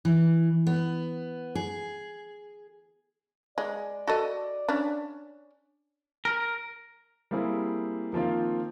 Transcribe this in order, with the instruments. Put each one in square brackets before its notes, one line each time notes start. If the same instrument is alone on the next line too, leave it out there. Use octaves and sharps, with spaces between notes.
[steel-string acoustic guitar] E3
B3
G#4
[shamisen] G#3 [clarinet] D5
[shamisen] F#4 A4 D#5
C#4 D4
[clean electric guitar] A#4
[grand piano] G3 A#3 C4 E4 G#4
D#3 F3 A#3 C4 F4